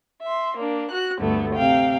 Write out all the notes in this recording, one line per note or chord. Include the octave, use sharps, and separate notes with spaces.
E5 C6
A#3 D4
F#4 F#6
D2 G2 D3 A3 B3
C3 F5 G5